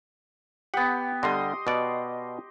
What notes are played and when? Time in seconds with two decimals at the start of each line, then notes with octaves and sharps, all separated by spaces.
0.74 B3 G4 F#5
1.23 D3 G3 D#5 C6 D#6
1.67 B2 D5 F#5